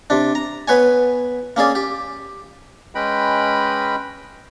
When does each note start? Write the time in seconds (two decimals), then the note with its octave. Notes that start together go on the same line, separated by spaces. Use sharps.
0.10 C3 D4
0.35 A#5
0.68 B3 B4 C#5 G#5
1.56 A#3 C#4 G#4 D5
1.75 G4
2.95 G#3 C#4 B4 D#5 G5 B5